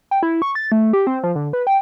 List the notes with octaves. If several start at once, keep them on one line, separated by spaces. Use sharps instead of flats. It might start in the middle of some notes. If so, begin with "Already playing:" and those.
G5
E4
C#6
A6
A3
G4
C4
F3
D3
B4
G5